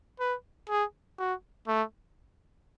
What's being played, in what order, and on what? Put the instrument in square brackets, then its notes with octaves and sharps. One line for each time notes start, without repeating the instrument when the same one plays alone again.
[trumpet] B4
G#4
F#4
A3